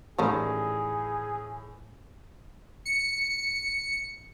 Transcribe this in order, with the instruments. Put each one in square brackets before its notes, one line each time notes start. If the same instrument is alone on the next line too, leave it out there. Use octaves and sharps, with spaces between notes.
[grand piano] A2 E3 [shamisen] D#3 G3 C#4 [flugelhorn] G#4
[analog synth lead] C#7